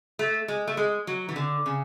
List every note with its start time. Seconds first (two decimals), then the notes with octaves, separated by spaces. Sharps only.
0.19 A3
0.48 G#3
0.67 A3
0.77 G#3
1.07 F#3
1.29 E3
1.36 D3
1.66 C#3